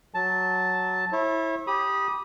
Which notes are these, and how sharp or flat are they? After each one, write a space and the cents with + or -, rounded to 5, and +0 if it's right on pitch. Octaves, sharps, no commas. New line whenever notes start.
F#3 +0 A5 +0
E4 -10 C#5 -40
G4 +0 B5 -25 D#6 +0